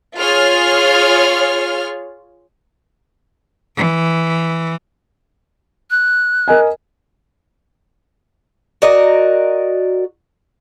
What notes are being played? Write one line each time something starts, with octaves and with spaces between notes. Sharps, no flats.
F4 G#4 C#5 F6
E3
F#6
A#4 D#5 G#5
F#4 A#4 D5 D#5